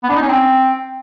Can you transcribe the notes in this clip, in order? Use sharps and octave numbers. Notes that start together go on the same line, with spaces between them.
B3
D4
D#4
C#4
C4